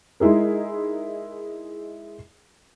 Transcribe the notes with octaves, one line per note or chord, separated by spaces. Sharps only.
G#3 D#4 E4 G#4 A#4